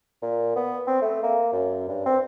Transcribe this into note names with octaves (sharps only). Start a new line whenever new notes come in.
A#2
B3
C4
A3
A#3
F#2
G2
C4